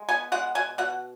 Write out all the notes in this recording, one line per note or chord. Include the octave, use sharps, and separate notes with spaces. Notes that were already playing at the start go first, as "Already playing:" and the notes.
Already playing: G#3
B3 G#5
G#3 F#5
B2 G#5
B2 F#5